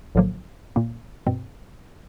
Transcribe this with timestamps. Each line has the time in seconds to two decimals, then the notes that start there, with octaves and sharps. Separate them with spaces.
0.15 A#1 A2 D3 F3 F#3 A#3
0.76 A#2 A#3
1.27 G2 B2 C4